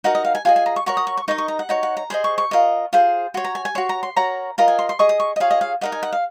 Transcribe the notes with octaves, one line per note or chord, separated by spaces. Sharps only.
D#4 F#4 A#4 D#5 F#5
D#5
F5
G#5
F4 G#4 D#5 G#5
G#5
A#5
C#6
F#4 A#4 C#5 C#6
D#6
C#6
C#6
D#4 A#4 D#5 C#6
C#6
A#5
F#5
D#4 F#4 C#5
F#5
A#5
G#4 C5 D#5 C6
C#6
C#6
F4 A#4 D#5
F4 G#4 C5
F#4 C#5 C6
A#5
G#5
G#5
F#4 C#5 C6
A#5
C6
F#4 A#4 C#5 A#5
F4 A#4 D#5 A#5
G#5
C6
C6
G#4 D#5 C#6
D#6
C#6
D#5
F4 G#4 C#5 F5
D#5
F5
D#4 A#4 D#5 F#5
G#5
F#5
F5